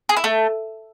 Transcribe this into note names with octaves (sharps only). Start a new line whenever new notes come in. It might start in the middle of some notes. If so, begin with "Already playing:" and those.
G#4
E4
A3